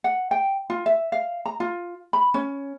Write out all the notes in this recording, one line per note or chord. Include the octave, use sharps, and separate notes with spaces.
F#5
G5
F4
E5
F5
A#5
F4
B5
C#4